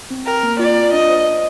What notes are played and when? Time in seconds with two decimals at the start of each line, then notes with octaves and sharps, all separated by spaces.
0.10 C4
0.26 A#4 G5
0.43 A#3
0.59 F4 D5
0.76 F4
0.93 D4 D#5
1.10 C5
1.26 C5